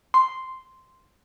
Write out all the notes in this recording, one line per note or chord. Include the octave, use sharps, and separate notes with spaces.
C6